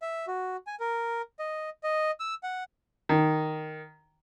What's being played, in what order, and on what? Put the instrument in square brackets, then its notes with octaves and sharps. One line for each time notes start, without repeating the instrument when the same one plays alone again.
[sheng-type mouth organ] E5
F#4
G#5
A#4
D#5
D#5
E6
F#5
[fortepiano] D#3